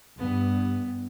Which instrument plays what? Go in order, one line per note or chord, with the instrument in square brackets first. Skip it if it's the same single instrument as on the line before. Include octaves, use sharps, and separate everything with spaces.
[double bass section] G2 [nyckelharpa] B3